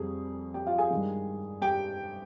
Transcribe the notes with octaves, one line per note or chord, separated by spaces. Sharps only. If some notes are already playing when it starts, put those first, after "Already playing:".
Already playing: F2 C3 G3 G#4
G4 G5
F4 F5
G#4 G#5
G2 D#3 G#3
G4 G5